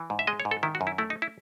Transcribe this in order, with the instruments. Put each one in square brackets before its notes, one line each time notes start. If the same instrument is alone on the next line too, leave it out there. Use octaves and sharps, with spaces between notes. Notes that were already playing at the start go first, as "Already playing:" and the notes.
Already playing: [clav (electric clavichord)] E3
G#2
E5
G#3 D#5
C#5
G#2
A4
D#3 E4
F#4
F#2
E4
A3 E4
D#4
E4